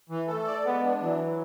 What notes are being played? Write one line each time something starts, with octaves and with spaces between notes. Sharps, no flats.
E3
A3 A4
D5
G#3 B3
D4
E3 F#3